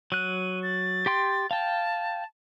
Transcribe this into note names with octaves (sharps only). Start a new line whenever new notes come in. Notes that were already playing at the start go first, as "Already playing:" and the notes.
F#3 F#6 D#7
A6
G4 G5 C6
F5 G5 A5